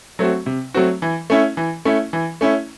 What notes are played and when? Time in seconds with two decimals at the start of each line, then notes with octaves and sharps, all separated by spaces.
0.19 F#3 A3 C4 F#4
0.46 C3
0.74 F#3 A3 C4 F#4
1.02 E3
1.30 A3 C#4 E4
1.57 E3
1.85 A3 C#4 E4
2.13 E3
2.41 A3 C#4 E4